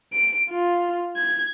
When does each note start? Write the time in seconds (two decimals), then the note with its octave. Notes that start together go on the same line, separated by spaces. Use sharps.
0.13 D7
0.49 F4
1.17 G#6